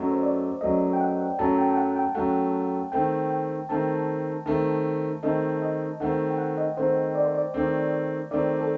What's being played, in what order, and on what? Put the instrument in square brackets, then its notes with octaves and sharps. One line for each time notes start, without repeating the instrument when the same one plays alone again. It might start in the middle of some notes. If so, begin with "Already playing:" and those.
Already playing: [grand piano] F#2 F#3 A3 [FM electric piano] D#5
[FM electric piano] C5
D5
[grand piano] F#2 F#3 A3 [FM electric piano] D#5
[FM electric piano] G5
F#5
[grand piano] F#2 F#3 A3 [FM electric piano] A5
[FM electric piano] G5
G5
F#5
G5
[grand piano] F#2 F#3 A3 [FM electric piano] F#5
[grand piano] D#3 A3 C4 [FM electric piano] G5
[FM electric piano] G5
[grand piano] D#3 A3 C4 [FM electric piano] A5
[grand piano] D#3 A3 C4 [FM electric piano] A5
[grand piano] D#3 A3 C4 [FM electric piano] D#5
[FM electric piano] D#5
[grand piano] D#3 A3 C4 [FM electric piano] F#5
[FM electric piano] G5
F#5
D#5
[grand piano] D#3 A3 C4 [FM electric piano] C5
[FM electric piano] D5
C5
D5
[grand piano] D#3 A3 C4
[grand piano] D#3 A3 C4 [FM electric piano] D5
[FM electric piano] A4